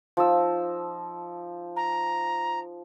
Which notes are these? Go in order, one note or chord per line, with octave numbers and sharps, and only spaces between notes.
F3 D#4 E6
A#5